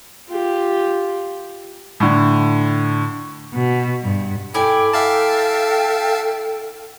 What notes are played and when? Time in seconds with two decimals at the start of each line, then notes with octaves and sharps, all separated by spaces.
0.28 F4 G4
2.00 A2 D3
3.54 B2
4.03 G2
4.54 E4 A4 D5 G5 G#5
4.93 A4 E5 F5 G5 A5